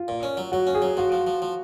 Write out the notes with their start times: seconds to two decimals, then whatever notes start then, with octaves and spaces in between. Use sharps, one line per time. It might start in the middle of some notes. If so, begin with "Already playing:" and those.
Already playing: F4
0.08 A#2
0.23 C#4
0.37 F#3
0.52 F#3 F#4
0.67 C#4
0.74 G#4
0.82 F#3
0.97 F3 F#4
1.12 F3
1.27 F3
1.42 F3